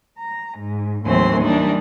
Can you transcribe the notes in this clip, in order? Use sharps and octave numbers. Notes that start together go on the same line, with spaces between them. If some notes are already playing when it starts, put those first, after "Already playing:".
A#5
G#2
D#2 A2 E3 F#3 C4 C6
E3 G3 A#3 D4 D#4